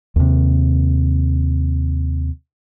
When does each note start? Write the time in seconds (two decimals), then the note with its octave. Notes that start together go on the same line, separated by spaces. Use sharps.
0.16 D#2 C3